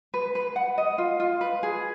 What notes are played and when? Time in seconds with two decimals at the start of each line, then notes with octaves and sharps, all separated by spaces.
0.14 B4
0.35 B4
0.56 F#5
0.78 D#5
0.98 F4
1.20 F4
1.41 B4
1.63 G#4